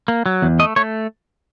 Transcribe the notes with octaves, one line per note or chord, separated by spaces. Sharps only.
A#3
F#3
E2
A3 D#5
A3 C#5